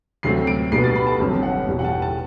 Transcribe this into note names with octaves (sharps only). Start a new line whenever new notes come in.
D2 C3 F#3 A3 C4 C7
D7
B1 B2 G3 B3 C7
A6
B5
A5
G1 G2 F#3 C4
F#5
E2 B2 G3
F#5
A5
G5
A5